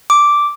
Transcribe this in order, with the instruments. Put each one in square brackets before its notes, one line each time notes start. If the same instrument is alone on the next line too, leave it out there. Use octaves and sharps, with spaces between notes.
[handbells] D6